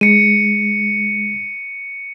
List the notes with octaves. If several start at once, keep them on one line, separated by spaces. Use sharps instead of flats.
G#3 C#7 D#7